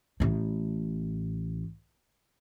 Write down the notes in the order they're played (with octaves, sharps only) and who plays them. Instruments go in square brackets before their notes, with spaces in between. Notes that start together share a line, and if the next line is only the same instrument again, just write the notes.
[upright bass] A1 A2